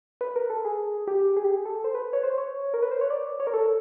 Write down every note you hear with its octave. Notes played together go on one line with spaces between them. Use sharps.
B4
A#4
A4
G#4
G4
G#4
G4
G#4
A4
C5
B4
C#5
C5
C#5
A#4
B4
C5
C#5
D5
C#5
A#4
A4